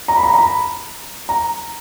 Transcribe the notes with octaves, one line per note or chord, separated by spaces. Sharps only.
A#5
B5
A#5
A#5
B5
A#5